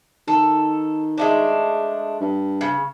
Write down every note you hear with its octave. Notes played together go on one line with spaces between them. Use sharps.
D#3 A4
G#3 A3 D4
G2
C#3